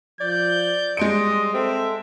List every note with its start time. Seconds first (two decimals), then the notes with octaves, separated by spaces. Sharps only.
0.21 F3 D5 G6
0.97 G3 G#3 D#5 C6 D7
1.54 C4 A4 E5